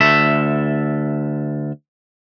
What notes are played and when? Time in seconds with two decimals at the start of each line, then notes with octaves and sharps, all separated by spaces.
0.01 D2 A4 E5